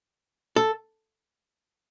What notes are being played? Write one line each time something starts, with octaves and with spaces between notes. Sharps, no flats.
A4